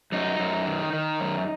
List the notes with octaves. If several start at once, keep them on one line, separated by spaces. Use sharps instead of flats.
F#2 D#4
F#2
D#3
D#3
F#2